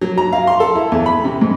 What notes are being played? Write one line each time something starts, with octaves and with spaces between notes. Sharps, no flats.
F#3
A#5
F5
C6
A4
E4
E2
B5
C3
G#2